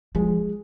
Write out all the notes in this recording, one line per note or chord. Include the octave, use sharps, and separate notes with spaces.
F3 G#3